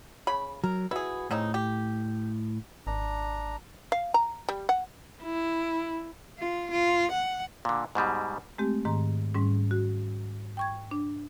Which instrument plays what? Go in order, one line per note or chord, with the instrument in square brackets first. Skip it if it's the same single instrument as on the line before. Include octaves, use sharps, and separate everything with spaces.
[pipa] C#3 B5
[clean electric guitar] F#3 [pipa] A#4
[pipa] E4 G#4 [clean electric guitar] F#4 B4
[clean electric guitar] A2 [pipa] C#3 C4 D#4
[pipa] G4
[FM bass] G#1 [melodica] D4 A#5
[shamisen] F5
A#5
G3
F#5
[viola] E4
[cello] F4
F4
F#5
[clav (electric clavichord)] A#2 D3
G#2 B2 G3 G#3
[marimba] G#3 A3 C4 G4
G#2 D#3 A#5
G#2 G3 C#4
F#4
G5 C#6 G#6
D4